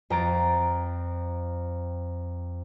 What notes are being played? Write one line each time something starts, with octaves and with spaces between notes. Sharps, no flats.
F2 G5 A#5 A6 D7